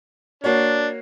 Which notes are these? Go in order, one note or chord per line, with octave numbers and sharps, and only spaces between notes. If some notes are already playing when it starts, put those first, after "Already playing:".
A#3 D4 F#4 C#5